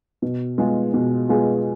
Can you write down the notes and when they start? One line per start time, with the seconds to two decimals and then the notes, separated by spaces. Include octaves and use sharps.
0.22 B2
0.58 G#3 B3 F4 G#4
0.94 B2
1.29 G#3 B3 F4 G#4